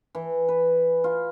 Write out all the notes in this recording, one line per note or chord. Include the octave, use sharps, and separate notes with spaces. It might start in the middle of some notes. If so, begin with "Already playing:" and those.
E3
B4
F4